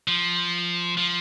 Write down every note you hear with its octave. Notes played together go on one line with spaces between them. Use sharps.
F3
F3